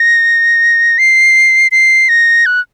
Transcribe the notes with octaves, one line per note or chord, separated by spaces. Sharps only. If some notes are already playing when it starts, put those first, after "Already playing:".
Already playing: A#6
C7
C7
A#6
F#6